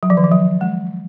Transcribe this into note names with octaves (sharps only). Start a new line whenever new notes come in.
F#3
F3
D#3
F3
F#3
G#3